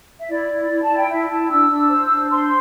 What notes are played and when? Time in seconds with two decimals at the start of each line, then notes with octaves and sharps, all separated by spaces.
0.18 E5
0.29 E4 D5
0.49 E4
0.70 E4
0.82 A5
0.89 E4
0.96 G5
1.09 E4 E5
1.30 E4 A5
1.49 D4 E6
1.70 D4
1.90 C5
2.10 D4
2.30 C5 C6